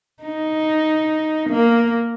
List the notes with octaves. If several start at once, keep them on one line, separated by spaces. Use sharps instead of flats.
D#4
A#3